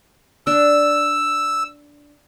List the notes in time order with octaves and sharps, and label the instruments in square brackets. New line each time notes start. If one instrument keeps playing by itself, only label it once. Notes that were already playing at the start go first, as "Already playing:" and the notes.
[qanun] D4 [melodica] E6